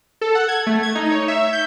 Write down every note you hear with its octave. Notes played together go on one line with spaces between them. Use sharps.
A4
F#5
G#6
A3
G#6
D#4
C#5
E5
G6